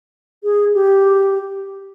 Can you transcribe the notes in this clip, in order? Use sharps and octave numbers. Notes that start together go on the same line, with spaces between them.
G#4
G4